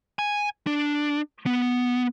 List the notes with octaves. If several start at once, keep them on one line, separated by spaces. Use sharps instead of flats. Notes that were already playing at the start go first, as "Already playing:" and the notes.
G#5
D4
B3